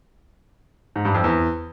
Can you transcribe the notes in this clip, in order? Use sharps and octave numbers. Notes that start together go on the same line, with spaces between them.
G#2
G2
F2
E2